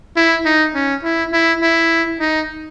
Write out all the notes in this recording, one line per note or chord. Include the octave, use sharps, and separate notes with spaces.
E4
D#4
C#4
E4
E4
E4
D#4